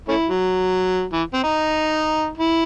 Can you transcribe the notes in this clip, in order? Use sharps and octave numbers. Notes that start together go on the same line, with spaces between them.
A3 C#4 E4
F#3
E3
C4
D#4
E4